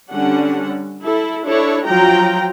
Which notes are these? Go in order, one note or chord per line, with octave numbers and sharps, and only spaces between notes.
D3 G3 C#4 D4 F#5
E4 A4
D4 E4 A4 C#5
F3 F#3 F4 G5 A#5